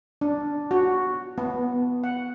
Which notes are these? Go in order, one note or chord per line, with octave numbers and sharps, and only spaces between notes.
D4
F#4
B3
F#5